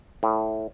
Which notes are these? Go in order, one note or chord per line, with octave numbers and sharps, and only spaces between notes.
A2